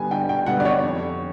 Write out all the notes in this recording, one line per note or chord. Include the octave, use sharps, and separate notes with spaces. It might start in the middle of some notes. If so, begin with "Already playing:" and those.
Already playing: D3 G3 B3 G#5
G2 G5
G5
D3 G3 B3 F#5
D5
C#5
F2